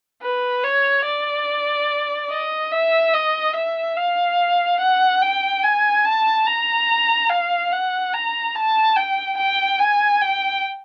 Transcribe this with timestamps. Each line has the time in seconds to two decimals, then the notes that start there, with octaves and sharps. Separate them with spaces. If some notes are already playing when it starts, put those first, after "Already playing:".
0.22 B4
0.64 C#5
1.05 D5
2.30 D#5
2.72 E5
3.14 D#5
3.55 E5
3.97 F5
4.80 F#5
5.22 G5
5.63 G#5
6.05 A5
6.46 A#5
7.30 F5
7.72 F#5
8.13 A#5
8.55 A5
8.96 G5
9.37 G5
9.79 G#5
10.21 G5